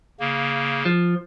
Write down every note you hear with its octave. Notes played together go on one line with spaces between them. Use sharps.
C#3 A#3
F3